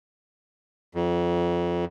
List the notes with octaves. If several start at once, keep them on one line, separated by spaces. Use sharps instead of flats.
F2